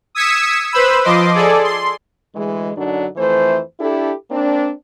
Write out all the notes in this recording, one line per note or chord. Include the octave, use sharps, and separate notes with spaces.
D#6 E6 G#6 B6 C#7 E7
B4 C5 B5 E6
F3 D#5 C6 D6
G#4 A4 D5
C6
D2 E3 G#3
F#2 D3 F#3 D4 D#4
F2 E3 A3 C5
D4 E4 G4 A4
A#3 C4 D4